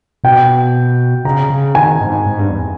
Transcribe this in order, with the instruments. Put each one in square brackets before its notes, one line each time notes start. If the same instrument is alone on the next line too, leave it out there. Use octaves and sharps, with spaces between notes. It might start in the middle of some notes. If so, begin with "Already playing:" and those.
[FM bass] B2 [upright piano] G5
[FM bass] C#3 [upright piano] A#5
[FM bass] C#3
[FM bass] D#3 [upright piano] G#5
[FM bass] G#2
G#2
G2
E2